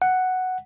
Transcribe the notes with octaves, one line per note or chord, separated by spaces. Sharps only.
F#5